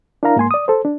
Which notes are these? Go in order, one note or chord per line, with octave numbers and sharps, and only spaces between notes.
D4 E4 A#4 F5 A#5
G#2 A#3 G#5 C6
D5 D#6
A4 C5
D4